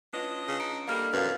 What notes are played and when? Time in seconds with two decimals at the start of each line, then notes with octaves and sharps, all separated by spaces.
0.13 C#4 D4 F4 B4 C#5 D#5
0.48 C#3
0.60 D#4 D7
0.88 G3 A#3 A4 D5 D#5 F5 F6
1.13 F#2 B2 E3 F3 B4 F5